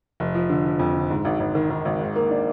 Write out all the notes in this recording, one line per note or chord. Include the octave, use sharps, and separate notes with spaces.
F1
F3
D3
F3
F2
D3
G#2
G#1
G#1
D#3
D#3
G#1
G#2
A#3
D4